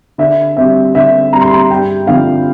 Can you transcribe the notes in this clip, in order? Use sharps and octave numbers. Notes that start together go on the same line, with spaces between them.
D3 E5
G3 C4 E5
D3 E5
G3 C4 A#5
C6
A#5
G2 G5
D3 F3 C4 F5